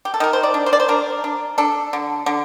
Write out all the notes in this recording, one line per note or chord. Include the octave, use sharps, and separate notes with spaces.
G4
A4
D#3 A#4
C5
D5
D4
C5
D5
C5
D4 A#4
D4
D4 A4
D3
D3